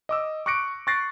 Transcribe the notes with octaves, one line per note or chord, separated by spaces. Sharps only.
D#5 D6 E6
C#6 D6 F#6 A#6 C#7 D7
C#6 F#6 A6 A#6 C7 D7